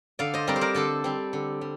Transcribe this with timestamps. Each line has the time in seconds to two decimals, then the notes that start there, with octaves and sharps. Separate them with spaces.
0.19 D3 D5 F5
0.34 C5 D#5
0.47 G3 C4 A#4 D5
0.56 C5
0.61 A#4 D5
0.74 D3 A4 C5
1.04 G3 C4
1.33 D3
1.61 G3